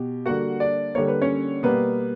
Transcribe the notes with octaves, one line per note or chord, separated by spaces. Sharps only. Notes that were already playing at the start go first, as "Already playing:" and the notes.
Already playing: B2 G4
D3 G3 A#3 F#4 F#5
D4 D5
D3 G3 A#3 C#5
B4
C#4 C#5
B2 G3 A#3 B3 B4